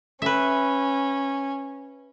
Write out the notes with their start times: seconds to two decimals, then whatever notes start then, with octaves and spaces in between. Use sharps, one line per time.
0.22 C#4 B4 E5